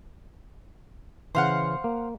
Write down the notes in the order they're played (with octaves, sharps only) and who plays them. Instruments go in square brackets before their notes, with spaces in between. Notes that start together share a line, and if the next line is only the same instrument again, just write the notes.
[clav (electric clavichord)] C#3 E3 [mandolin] C5 F5 F#5
[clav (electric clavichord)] A#3